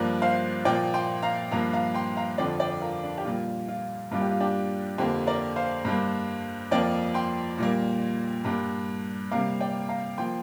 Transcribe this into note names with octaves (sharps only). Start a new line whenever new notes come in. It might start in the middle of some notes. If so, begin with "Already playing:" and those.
Already playing: G2 F3 A#3 A#4 D5
C5 F5
A#2 F3 A#3 D5 G5
G5 C6
F5 A#5
G2 F3 A#3 F5 A#5
F5 A#5
G5 C6
F5 A#5
F2 D3 F3 D5 G5
D5 G5
F4 A#4
D4
G4
A#2 G3 A#3 F4
F4
G2 G3 A#3 F4
G4
F4
D4 G4
F2 D3 A#3 G4 C5
A#4 D5
C5 F5
G2 G3 A#3
F2 F3 A#3 D5 G5
G5 C6
A#2 G3 A#3
G2 G3 A#3
C3 G3 A#3 F5 A#5
D5 G5
F5 A#5
F3 A#3 G5 C6